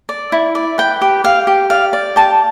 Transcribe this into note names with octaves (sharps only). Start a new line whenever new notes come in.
D5
E4
D5
B4 G5
G4
G4 F5
G4
D5 F5
D5
G4 A5